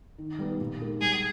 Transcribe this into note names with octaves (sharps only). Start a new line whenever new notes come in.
D#3
G3 B3 D#4
A#2
G#3 D#4 G4 A#4
G3 G#4